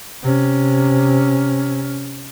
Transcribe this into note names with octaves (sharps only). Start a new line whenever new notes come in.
C3 C#4